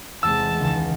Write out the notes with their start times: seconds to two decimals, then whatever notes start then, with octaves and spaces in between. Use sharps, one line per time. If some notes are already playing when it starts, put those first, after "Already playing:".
0.23 E2 C3 G#3 A5 E6
0.60 C#2 D#3